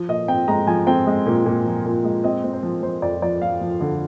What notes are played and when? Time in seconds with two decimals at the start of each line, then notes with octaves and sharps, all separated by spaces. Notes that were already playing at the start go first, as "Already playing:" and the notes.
Already playing: F3
0.08 A#2 D#5
0.28 C4 G5
0.48 G#3 A#5
0.67 F3 G#5
0.87 C4 G5
1.07 G#3
1.26 A#2
1.46 A#2
1.65 F3
1.85 A#2
2.04 G#3
2.24 C4 D#5
2.44 C4
2.53 C5
2.63 F3
2.83 F3 C5
3.02 F2 D5
3.22 F3 D5
3.41 F3 F5
3.61 F3
3.81 D3